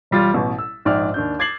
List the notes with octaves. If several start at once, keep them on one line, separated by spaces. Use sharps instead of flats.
E1 G3 F4 A6
A1 B2
E6
A#1 G#2 D5 G5 F6
D#2 D4 G6
D6 G#6 A6 C7 F#7